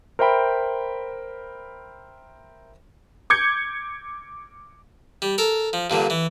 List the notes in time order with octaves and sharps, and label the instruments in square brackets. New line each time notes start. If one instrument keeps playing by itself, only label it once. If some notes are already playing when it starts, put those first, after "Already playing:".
[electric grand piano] A#4 C5 E5 G5 B5
[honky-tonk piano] D6 G6 G#6 C#7
[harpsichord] G3
A4 A#4
F3
G2 A#2 D3
E3